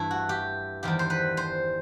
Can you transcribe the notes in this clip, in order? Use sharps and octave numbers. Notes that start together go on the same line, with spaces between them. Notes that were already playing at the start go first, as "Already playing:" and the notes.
Already playing: G2 E3 A3 E4
F#4
G4
E2 D#3 G3 G4
C5
B4
C5